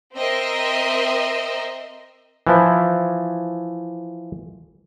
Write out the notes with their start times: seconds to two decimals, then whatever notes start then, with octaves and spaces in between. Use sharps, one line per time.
0.16 C4 A#4 D#5 E5 C6
2.47 E3 F3 E4